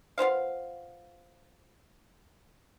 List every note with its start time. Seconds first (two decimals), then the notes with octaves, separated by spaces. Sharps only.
0.18 B3 F4 C5 F5